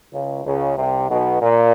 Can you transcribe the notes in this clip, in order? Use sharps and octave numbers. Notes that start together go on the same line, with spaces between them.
C#2 C#3
C#2 C#3
C2 C3
B1 B2
A#2